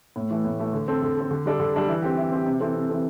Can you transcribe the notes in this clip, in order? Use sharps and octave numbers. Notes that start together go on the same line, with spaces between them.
A2
E3 A3
A2
E3 A3
D3
C4 A4
D3
C4 A4
D3
G3 D4 A4
D3
G3 D4 A4
E3
C4 G4
E3
C4 G4
C3
E3 C4 A4
C3
E3 C4 A4